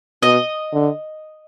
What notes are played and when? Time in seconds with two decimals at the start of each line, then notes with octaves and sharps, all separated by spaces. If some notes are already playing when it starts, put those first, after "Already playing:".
0.22 B2 D#5
0.73 D3